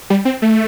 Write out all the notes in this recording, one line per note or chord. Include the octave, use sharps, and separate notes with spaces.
G3
C4
A3